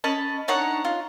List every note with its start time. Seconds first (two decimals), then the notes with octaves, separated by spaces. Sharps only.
0.04 C#4 D#5 A5 B5
0.48 D4 D#4 C#5 F#5
0.85 F4